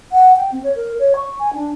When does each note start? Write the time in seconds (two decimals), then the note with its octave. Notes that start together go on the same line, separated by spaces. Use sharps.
0.12 F#5
0.36 G5
0.52 C4
0.64 C#5
0.76 A#4
0.99 C#5
1.16 C#6
1.39 G#5
1.53 D4